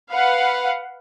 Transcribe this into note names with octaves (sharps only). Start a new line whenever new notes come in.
B4 F5 F#5